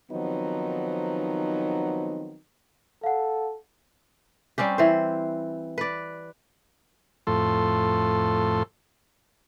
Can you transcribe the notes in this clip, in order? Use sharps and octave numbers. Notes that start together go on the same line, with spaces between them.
D#3 F3 F#3 B3 C4 D#4
A4 F5 F#5
G3 C4 C#4 G4
E3 C5
B4 D5
F2 A2 A4 C6